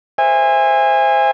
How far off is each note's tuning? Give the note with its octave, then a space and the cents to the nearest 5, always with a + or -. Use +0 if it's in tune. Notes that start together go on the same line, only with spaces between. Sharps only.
C5 +0 E5 +0 G#5 -25